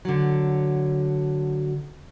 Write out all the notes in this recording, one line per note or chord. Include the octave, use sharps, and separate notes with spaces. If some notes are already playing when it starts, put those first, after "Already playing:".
D3 F#3